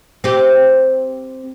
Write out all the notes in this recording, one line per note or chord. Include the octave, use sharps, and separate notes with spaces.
C4 G4